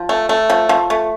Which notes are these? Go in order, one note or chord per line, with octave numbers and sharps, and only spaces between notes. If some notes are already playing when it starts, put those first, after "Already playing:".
Already playing: F3
A3
A3
F3
F3
A3